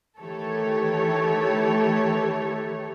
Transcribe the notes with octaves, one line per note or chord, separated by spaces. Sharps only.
D#3 E3 A3 G4 A4 C#5